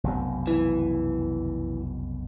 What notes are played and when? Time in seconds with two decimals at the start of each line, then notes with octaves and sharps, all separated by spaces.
0.04 F1 B1 F#2
0.47 E3